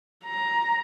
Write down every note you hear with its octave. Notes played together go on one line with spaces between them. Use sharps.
A#5